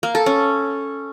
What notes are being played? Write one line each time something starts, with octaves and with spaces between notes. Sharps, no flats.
A#3
A4
C#4